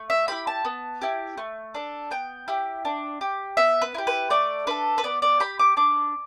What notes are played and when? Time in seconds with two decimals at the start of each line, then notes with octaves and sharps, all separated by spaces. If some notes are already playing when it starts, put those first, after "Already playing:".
Already playing: A3
0.10 E5
0.28 E4 G4 B5
0.47 A5
0.65 B3
1.01 E4 G4
1.37 A3
1.74 D4 A4
2.11 B3 G5
2.48 E4 G4
2.85 D4
3.21 G4
3.57 B3 E5
3.82 B4
3.94 E4 G4
4.07 B4
4.30 A3 D5
4.67 D4 A4 B4
4.98 B4
5.04 B3 D5
5.22 D5
5.40 G4 B5
5.59 D6
5.77 D4 D6